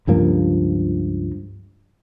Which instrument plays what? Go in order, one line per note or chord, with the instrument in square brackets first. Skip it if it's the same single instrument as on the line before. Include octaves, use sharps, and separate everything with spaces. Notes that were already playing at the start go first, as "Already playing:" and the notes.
[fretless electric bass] C#2 G2 F3 A#3